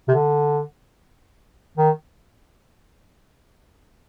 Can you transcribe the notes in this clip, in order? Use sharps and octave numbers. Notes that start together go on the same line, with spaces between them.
C3
D3
D#3